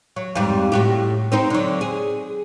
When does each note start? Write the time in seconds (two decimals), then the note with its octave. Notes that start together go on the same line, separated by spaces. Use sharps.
0.16 F#3
0.35 F2 G#2 G3
0.72 A2 F#4 G4
1.32 C4 D#4 C5
1.50 D3 F#3
1.81 G#4